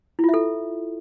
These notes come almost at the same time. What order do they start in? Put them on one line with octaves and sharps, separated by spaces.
E4 F4 E5 A4